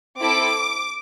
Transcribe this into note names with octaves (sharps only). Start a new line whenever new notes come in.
C4 E4 A4 D6